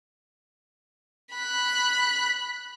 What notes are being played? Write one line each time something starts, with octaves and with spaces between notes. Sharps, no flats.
B5 F#6